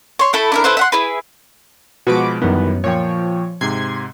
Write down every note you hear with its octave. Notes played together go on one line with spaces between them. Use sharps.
C#5 C6
A3 E4 A4
D4 E4 A#4
E4 A4 B4 C5
E5 F#5 C6
E4 G#4 B4
B2 F3 G#3 F#4 B4 D6
F#2 D#3 E3 G3 B3
A#2 F3 C#5 G5
G#2 C3 C6 G#6